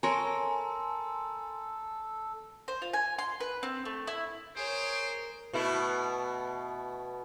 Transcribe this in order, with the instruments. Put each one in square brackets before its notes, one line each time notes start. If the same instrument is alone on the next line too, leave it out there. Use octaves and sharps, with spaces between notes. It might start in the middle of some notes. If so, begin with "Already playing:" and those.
[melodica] A4 [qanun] A#4 C#5 [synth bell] G#5 A#5 C6
[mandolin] C5
F4
G#5
C6
B4
C4
A3
E4
[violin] G#4 C#5 [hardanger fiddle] A#4 [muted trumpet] C5 [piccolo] D7
[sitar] B2 A3 E4